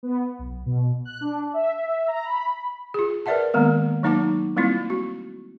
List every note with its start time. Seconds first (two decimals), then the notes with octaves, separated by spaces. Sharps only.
0.03 B3
0.39 B1
0.66 B2
1.05 F#6
1.21 D4
1.54 E5
2.08 A#5
2.25 B5
2.94 F4 G#4
3.26 A#4 B4 D5 E5 F#5 A5
3.54 D#3 G#3 A#3 B3 A#4
4.03 F#3 A#3 D#4 F#5 A5 D6
4.56 G3 A3 A#3 C4 E4 F4
4.90 F#4